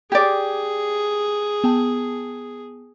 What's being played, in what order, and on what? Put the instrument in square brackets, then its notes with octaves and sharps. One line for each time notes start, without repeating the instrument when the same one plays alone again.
[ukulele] G4 D5 [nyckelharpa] G#4 [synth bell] G#6
[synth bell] B3 G5 A5